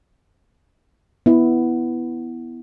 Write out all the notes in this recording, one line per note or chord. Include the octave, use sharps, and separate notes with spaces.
B3 E4